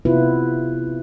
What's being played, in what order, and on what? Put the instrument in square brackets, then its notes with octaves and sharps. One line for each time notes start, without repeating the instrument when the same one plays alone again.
[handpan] C3 B3 E4 F4 B4